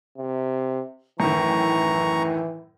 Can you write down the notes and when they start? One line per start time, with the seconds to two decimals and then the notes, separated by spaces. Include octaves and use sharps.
0.18 C3
1.20 F#2 A2 D#3 E3 A#5 C#6